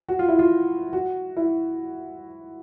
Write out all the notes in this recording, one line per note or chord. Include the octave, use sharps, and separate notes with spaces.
F#4
F4
E4
F4
F#4
E4